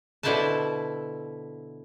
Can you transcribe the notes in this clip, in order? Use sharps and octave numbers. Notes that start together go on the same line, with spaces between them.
B2 D3 E4 C5 E5 A5